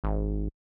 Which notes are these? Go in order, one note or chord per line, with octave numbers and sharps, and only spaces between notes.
G#1